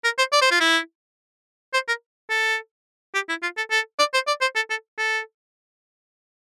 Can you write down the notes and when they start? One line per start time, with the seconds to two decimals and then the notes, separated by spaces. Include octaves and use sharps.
0.04 A#4
0.18 C5
0.32 D5
0.42 C5
0.51 F4
0.61 E4
1.74 C5
1.88 A#4
2.30 A4
3.14 G4
3.29 E4
3.43 F4
3.57 A4
3.71 A4
3.99 D5
4.14 C5
4.27 D5
4.41 C5
4.56 A4
4.70 A4
4.98 A4